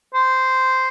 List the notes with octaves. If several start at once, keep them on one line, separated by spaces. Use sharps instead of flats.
C5